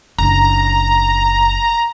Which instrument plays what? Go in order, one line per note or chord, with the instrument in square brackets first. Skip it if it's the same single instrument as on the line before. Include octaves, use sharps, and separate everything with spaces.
[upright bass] F#1 D4 [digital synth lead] A#5